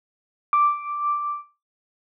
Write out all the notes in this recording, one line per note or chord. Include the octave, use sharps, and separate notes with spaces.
D6